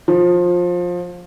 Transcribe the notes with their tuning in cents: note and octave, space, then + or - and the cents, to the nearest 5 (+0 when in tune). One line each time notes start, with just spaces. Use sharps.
F3 +20